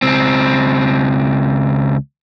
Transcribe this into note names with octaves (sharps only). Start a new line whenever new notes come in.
C#2 C4